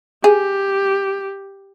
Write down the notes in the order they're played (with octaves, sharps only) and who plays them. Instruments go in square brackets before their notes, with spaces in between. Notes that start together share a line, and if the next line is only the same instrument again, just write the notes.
[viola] G4 [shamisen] G#4